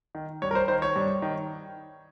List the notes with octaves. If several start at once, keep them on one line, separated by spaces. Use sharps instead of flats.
D#3
G2 C#5
A#4
C5
D#3 C5
C#5
G2
D#3